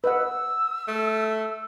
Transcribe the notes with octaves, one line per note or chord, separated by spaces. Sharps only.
B4 D#5 F#5 E6
A3